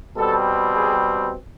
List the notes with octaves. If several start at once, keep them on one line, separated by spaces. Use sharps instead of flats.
B2 G3 C4 A4
G#4